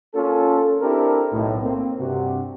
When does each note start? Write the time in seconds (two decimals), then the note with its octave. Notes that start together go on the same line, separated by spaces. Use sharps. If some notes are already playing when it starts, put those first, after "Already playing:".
0.14 A#3 C#4 F4 A4
0.81 C4 D4 E4 G4 A4 A#4
1.33 B1 A2
1.62 A#3 C4
1.99 G2 C3 F#4